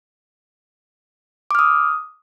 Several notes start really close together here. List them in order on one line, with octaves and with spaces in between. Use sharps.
D6 F6 D#6